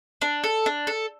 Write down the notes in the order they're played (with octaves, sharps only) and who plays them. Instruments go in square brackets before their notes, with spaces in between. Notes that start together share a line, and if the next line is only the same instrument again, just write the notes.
[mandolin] D4
A4
D4
A4